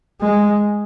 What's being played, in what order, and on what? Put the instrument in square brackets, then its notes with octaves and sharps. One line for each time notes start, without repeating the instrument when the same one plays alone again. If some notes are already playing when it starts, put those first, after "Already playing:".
[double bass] G#3